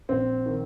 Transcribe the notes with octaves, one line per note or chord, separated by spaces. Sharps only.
A#1 C4
D#3